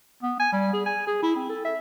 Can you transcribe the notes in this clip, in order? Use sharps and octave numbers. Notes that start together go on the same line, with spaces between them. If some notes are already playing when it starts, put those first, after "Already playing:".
B3
G#5
G3
G#4
G#5
G#4
E4
C4
A4
E5